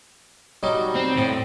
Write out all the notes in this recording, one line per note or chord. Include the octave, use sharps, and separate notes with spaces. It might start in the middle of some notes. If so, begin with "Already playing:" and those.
F#3 G3 D#4
C4
A2 C4